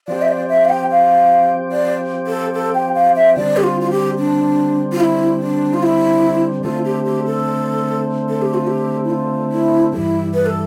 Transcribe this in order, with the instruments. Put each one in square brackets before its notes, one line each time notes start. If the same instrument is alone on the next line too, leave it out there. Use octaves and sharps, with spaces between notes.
[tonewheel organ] F3 C4 G4 [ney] D5
[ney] E5
D5
E5
F5
G5
F5
D5
A4
A4
G5
F5
E5
[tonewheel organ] D3 G3 C4 [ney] D5
[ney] G4
F4
F4
G4
D4
F4
E4
D4
F4
E4
[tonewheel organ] D3 A3 C4 [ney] F4
[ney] G4
G4
A4
A4
G4
F4
G4
E4
F4
E4
[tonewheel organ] G2 E3 G3 [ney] E4
[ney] B4
A4